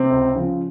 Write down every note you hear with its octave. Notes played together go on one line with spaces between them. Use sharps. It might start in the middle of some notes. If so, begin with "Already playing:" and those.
Already playing: C3 C4
C#2
C#3 F3